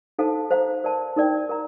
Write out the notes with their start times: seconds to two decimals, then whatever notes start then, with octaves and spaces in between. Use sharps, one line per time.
0.19 D#4 A4 C5 F5 A5
0.51 C5 F5 A#5
0.84 A#4 D5 F5 A5
1.16 D#4 A#4 D5 G5
1.49 A#4 F5 A#5